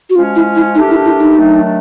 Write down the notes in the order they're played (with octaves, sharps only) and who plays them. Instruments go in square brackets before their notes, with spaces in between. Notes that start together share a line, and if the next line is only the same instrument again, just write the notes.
[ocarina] F#4
[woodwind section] F3 G#3 C#4 [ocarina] F4
[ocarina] E4
E4
[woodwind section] A3 D4 G4 A#4 [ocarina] D#4
[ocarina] E4
E4
D#4
[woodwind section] D#3 F#3 A3 D4